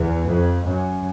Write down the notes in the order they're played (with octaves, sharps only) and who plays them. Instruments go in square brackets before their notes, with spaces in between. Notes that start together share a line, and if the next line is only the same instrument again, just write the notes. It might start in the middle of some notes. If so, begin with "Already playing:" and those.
Already playing: [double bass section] E2
F2
F#2